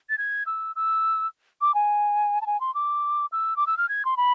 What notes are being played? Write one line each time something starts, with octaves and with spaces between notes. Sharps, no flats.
A6
G#6
E6
E6
D6
G#5
A5
G#5
C6
D6
E6
D6
E6
F6
G#6
C6
B5